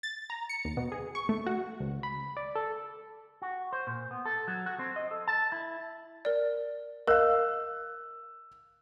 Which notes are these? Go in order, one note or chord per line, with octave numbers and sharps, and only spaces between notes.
A6
A#5
C#7
D#2
B2
G#4
C#6
A3
F#4
C#2
B5
D5
A4
F#4
C5
A#2
B3
A4
F#3
F#4
C4
D#5
A4
A5
E4
A#4 D5
A#4 D#5 F5 E6 F#6